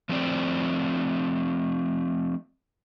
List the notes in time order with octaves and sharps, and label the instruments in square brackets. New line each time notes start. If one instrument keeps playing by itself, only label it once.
[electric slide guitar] F3 A3 C4 C5 D5